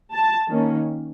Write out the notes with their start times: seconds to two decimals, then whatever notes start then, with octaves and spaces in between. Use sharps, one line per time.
0.13 A5
0.50 D#3 A#3 C#4